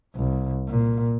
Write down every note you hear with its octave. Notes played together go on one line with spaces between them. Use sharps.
C2
A#2